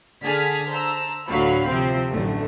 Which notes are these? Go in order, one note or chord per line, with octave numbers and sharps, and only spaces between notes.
D3 G#4 G#5 A5 F6 B6
C5 A5 A#5 E6
D2 A2 D3 F#3 F5 B5
C3 F3 C4
A1 F#2 D3 A3